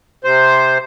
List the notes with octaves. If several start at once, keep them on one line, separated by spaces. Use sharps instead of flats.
C3 C5